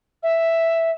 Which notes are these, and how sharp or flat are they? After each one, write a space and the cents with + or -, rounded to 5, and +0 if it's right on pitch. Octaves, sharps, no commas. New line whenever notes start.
E5 +0